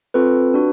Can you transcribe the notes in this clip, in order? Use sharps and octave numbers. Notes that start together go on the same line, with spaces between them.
C4 F4 A4 B4
D4 F#4